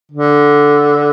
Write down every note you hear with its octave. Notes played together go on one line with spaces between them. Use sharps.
D3